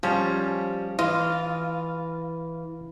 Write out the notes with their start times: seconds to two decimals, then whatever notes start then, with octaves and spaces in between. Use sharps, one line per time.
0.03 F3 G3 C#4
0.99 E3 F4 D#5